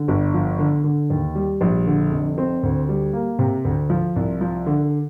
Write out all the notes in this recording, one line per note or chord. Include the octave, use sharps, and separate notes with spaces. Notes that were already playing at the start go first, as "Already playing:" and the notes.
Already playing: D3
G1
F3
D3
D3
D#2
G3
A#1
D3
F1
C4
D2
G3
A#3
C3
D2
F3
C2
F3
D3